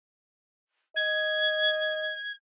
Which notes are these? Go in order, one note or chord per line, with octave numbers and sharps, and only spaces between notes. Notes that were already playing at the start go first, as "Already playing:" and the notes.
D#5 G#6